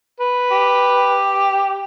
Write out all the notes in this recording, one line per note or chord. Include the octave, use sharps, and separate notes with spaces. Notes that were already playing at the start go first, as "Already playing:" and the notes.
B4
G4